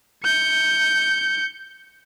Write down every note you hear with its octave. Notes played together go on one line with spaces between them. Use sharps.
G6 C#7